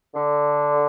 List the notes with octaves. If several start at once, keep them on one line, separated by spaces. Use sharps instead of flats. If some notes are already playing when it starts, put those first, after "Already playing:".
D3